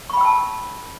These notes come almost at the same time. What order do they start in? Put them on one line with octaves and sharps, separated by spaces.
C#6 B5 G5 E6 A5